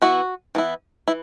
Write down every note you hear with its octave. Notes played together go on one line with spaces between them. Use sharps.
E3 B3 E4 F#4
E3 B3 E4
E3 E4